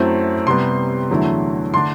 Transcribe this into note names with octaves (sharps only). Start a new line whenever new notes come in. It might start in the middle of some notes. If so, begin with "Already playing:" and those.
Already playing: F#2 F#3 A3 C4 E4
C3 G3 B3 C6
E2 D3 F#3 A3 E4
D3 A3 D4 C6